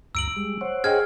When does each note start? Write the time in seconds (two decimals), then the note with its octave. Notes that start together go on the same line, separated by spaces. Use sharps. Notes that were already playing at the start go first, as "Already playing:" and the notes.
0.15 D2 G2 A#5 E6 D7 F#7
0.36 G3 G#3
0.61 C5 C#5 F#5
0.84 G#4 D#5 G5 F6 G#6